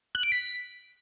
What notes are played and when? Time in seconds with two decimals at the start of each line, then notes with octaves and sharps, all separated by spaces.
0.15 F#6
0.23 D7
0.32 B6